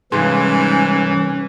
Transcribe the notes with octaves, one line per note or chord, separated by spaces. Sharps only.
C2 G#2 E3 C#4 G#4 C6